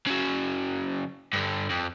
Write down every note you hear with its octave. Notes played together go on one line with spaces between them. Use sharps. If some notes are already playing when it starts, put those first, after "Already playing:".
C#3 F#3
G2 D3
F2